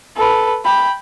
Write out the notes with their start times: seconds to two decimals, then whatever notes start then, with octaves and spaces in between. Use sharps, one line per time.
0.16 A4 B4
0.64 G5 B5